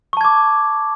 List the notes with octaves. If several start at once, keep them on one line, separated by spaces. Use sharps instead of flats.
A5 C#6 D6 G#6